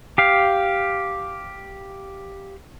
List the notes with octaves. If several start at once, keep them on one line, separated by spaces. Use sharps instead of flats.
G4 F5